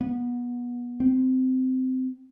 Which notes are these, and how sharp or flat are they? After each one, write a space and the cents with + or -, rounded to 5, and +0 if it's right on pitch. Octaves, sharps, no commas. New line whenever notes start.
B3 -25
C4 -20